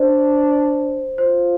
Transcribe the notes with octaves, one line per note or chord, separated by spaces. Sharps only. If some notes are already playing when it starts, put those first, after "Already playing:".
Already playing: D4 C5
F4 C5